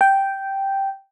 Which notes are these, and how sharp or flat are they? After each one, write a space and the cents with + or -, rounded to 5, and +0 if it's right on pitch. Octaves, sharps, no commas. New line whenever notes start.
G5 -5